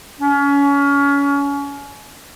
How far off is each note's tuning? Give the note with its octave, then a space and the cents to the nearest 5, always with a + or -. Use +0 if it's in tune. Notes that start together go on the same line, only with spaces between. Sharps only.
C#4 +30